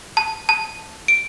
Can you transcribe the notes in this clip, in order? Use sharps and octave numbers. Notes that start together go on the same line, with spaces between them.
A5
A5
D7